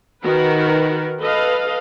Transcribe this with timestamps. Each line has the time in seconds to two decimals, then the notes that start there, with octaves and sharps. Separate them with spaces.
0.23 D#3 F#4 A#4 B4
1.21 A4 B4 D#5 F5